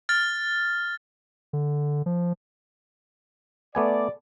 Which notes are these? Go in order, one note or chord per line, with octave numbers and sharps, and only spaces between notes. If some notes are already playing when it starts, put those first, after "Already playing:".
F6 A6
D3
F3
A3 B3 D5 G#5